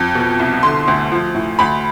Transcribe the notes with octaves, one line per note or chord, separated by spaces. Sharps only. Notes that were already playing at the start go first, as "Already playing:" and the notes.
Already playing: F2
B2
C2
D3 C6
D2
F3
A2
D2 B5